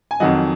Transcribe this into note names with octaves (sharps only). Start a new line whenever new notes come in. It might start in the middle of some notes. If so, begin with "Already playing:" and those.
G#5
F2 D#3 F#3 D#5 F#5